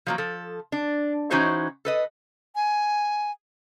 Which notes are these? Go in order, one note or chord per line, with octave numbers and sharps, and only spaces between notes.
F3 F#3 A#3
F3 A4
D4
E3 C#4 D#4 F#4 C5 C#5
A4 B4 D#5
G#5